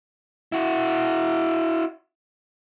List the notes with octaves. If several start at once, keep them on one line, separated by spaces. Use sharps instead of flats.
E4 F#4